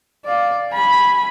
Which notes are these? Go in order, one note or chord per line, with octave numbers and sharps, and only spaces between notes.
D5 F5
G#5 B5